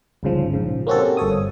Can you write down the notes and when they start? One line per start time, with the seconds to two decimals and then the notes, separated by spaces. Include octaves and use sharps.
0.23 G1 C#2 G#2 C#3 F3
0.54 A#1 G#2 C#3
0.87 A#3 C4 C#4 F#4 G4 A4
1.17 G1 A4 C#5 D#6